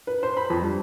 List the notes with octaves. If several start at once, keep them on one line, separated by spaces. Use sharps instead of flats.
B4
C5
B5
F2
G2